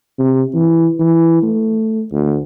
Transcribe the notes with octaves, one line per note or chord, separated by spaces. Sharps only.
C3
E3
E3
A3
D2